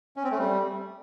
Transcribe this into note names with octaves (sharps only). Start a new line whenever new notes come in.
C#4
C4
A3
G3